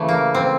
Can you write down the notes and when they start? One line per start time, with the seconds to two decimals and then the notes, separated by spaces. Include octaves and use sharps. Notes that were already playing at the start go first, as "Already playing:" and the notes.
Already playing: C#3 E3 A3
0.08 A#3
0.35 C4